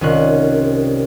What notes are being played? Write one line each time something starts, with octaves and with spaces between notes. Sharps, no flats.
C2 D#3 C#4 F4 F#6